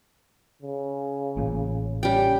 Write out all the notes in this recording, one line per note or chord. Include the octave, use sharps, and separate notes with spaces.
C#3
A1 A#2
G3 C#4 G5